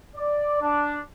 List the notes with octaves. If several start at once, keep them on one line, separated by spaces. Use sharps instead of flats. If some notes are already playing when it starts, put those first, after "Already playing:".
D5
D4